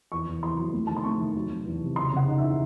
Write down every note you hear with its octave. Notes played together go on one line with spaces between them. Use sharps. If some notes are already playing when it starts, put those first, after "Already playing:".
E2 C#6
E2
E2 C6
F#3
A3
D#3 A5
C6
A3 C#6
D#3
F#3
F#3
E2
C3
C#3 C6
C#3 F#5
D#4
E5
E3